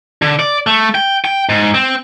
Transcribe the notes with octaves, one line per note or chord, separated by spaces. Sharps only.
D3
D5
A3
G5
G5
G#2
C4